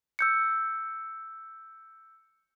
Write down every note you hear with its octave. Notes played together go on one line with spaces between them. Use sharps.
E6 G6 C#7